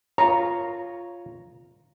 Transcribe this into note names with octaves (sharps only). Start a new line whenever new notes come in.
F4 C#5 A#5